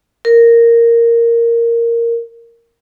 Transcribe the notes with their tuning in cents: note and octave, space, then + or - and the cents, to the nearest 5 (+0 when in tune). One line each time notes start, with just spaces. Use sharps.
A#4 -5